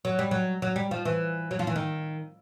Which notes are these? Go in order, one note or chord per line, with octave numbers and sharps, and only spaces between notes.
F#3
G3
F#3
F#3
G3
F3
E3
F#3
F3
E3
D#3